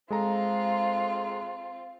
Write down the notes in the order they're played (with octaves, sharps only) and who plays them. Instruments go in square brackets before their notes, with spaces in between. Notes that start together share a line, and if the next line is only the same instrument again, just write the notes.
[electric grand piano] G#3 A4 A#5 [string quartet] C4 F4